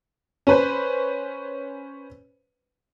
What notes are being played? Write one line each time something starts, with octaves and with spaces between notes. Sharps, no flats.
C#4 B4 C5